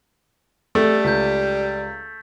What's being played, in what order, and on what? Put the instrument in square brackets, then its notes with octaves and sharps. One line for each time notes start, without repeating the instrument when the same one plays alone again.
[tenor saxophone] G3 [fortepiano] A3 [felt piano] A4
[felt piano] C#2 [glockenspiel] G6 A6 B6